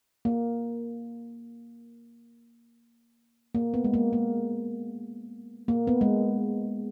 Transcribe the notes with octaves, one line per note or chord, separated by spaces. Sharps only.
A#3
A#3
B3
G#3
A#3
A#3
A#3
B3
G#3